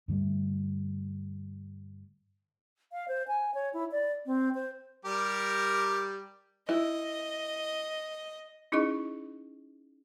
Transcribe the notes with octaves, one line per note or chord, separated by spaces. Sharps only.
G2 D3 G3 A3
F5
C5
G#5
C#5
E4
D5
C4
C5
G3 G4 A#4
E4 D#5
C#4 D#4 E4 G#4 D#5 C#6